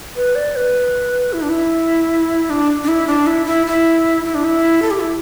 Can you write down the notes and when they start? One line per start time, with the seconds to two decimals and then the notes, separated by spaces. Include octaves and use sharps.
0.16 B4
0.35 D5
0.56 B4
1.33 E4
1.42 D4
1.50 E4
2.50 D4
2.84 D4
2.88 E4
3.07 D4
3.27 E4
3.46 E4
3.67 E4
4.25 E4
4.34 D4
4.44 E4
4.82 A4
4.91 G4
4.99 E4